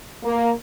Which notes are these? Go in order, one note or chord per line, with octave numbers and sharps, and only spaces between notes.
A#3